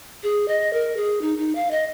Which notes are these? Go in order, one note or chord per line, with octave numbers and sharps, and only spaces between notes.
G#4
D#5
A#4
G#4
D#4
D#4
F5
D#5